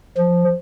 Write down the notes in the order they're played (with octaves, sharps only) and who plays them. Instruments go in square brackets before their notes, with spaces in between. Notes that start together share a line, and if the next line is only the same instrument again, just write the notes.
[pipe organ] F3